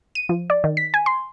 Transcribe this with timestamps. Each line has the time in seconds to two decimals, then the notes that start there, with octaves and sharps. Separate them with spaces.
0.15 D#7
0.29 F3
0.50 D5
0.64 D#3
0.77 B6
0.94 G#5
1.06 C6